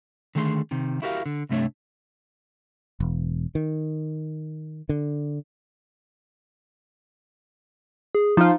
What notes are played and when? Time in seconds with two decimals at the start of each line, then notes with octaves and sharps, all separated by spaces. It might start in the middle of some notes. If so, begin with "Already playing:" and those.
0.35 D3 D#3 A3 G#4 B5 C6
0.71 C3 D#3
1.02 E4 F#4 G4 A#4 D5 F5
1.26 D3
1.49 C2 G2 C3 A3 D4 C#5
3.00 E1
3.55 D#3
4.89 D3
8.15 G#4
8.37 F3 D#4 F4